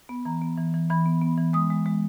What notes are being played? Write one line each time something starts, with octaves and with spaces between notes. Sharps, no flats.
B3
E3 A#5
B3
E3
E3
E3 B5
B3
B3
E3
G#3 D#6
G#3
G#3